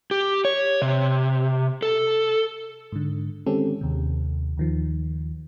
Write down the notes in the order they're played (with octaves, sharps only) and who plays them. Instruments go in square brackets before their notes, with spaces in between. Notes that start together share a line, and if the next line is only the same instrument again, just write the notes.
[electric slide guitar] G4
C#5
C3
A4
[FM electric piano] G#2 D3
D#3 G#3 C4 C#4 G4 A4
D#2 C3
D#2 D#3 F3